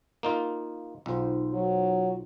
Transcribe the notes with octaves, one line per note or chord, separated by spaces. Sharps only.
A#3 D#4 F4
B1 D#4 F4 C5
F#3